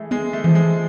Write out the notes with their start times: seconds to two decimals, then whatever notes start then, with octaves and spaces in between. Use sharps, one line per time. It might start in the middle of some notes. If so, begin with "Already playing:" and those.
Already playing: E3 G#3 A3
0.11 G#3 B3
0.33 A3
0.44 E3 F3
0.55 G#3